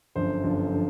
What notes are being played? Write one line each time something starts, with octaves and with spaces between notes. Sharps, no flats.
G1 F#2 D3 F3 C5
G1 F#2 D3 F3
D3 F3